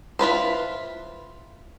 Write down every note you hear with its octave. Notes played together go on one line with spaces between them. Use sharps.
E4 F4 B4 C5